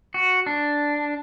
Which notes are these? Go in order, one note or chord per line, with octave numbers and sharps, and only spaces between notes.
F#4
D4